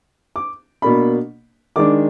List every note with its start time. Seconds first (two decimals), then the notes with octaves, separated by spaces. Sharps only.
0.36 D6
0.82 B2 A#3 D4 B5
1.76 D#3 G#3 D4 D6